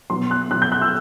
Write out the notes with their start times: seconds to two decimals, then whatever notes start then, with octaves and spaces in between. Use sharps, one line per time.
0.10 B2 F#3 C6
0.31 F#6
0.51 B2 F#3 F#6
0.62 G6
0.72 F#6
0.81 E6